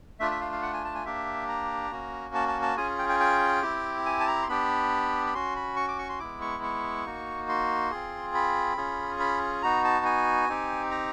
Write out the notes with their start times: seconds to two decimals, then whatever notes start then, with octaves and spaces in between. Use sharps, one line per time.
0.20 A3 D4 F4 E5
0.31 E5
0.41 F5
0.52 F5
0.62 F#5
0.73 G#5
0.84 A5
0.95 G#5
1.05 A#3 D4 G4 E5
1.48 A#5
1.91 A#3 C#4 F#4
2.35 A5
2.48 A5
2.62 A5
2.77 C#4 F4 G#4 G#5
2.99 G5
3.09 G5
3.20 G5
3.62 C4 E4 G4
4.06 G#5
4.20 A5
4.27 A#5
4.43 C6
4.49 B3 D4 G4 B5
5.26 B5
5.34 C#4 F#4 C6
5.56 B5
5.76 C#6
5.88 D6
5.99 C#6
6.09 C6
6.20 G#3 B3 E4 D6
6.41 C#6
6.63 C#6
7.06 A#3 D#4 F#4
7.49 C6
7.91 C4 F4 G#4
8.34 B5
8.77 C#4 F4 G#4
9.20 B5
9.62 B3 D#4 F#4 A#5
9.85 A5
10.05 G#5
10.49 C4 D#4 G4
10.91 A#5